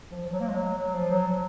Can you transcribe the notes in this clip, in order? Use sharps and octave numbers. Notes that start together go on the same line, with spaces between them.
F3
F3
F#3
A#3
G#3
F#3
F#3
F3
F#3
F#3